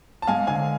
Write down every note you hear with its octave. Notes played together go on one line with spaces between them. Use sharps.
A5
G#3 F5 G#5
D3 F5 G#5